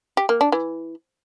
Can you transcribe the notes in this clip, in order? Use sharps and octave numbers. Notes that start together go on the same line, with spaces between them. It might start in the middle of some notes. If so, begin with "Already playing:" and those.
G4
A#3
D4
E3